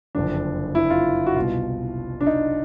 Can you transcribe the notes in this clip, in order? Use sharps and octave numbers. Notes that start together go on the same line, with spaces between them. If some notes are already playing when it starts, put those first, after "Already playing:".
F#1 F2 D3 D4
E4
F4
F#4
C2 B2 F4
D4
D#4